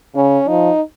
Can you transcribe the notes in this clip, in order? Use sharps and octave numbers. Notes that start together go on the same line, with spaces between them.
C#3 C#4
F3 D#4